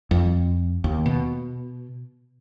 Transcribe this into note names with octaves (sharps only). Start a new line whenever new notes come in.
F2
D#2
B2